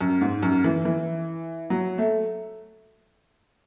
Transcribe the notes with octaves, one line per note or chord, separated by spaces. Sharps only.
F#2
G#2
F#2
E3
E3
F#3
A3